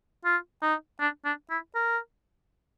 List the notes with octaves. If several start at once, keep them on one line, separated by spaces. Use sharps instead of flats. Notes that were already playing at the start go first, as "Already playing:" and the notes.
F4
D#4
D4
D4
E4
A#4